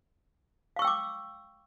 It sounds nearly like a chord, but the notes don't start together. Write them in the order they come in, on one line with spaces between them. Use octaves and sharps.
F5 C#6 E6 G5 D6